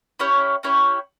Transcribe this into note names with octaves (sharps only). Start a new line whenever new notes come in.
C#4 E4 G4 C#5
C#4 E4 G4 C#5